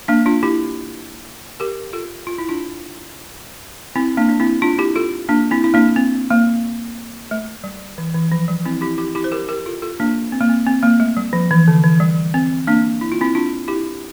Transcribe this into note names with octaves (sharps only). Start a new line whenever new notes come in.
A#3 D4
D4 F4
E4 G4
G4 A#4
F4 A4
F4
E4
D4 F4
C4 E4
A#3 D4
D4
C4 E4
D4 F4
E4 G4
F4 A4
A#3 D4
C4 E4
E4
A#3 D4
C4
A#3
A3
G3
E3
E3
F3
G3
C4 E4
E4 G4
E4 G4
E4 G4
C5
G4 A#4
G4 A#4
F4 A4
F4 A4
A#3 D4
C4
A#3
C4
C4
A#3
A3
G3
F3
E3
D3
E3
G3
C4
A#3 D4
E4
F4
C4 E4
D4 F4
E4 G4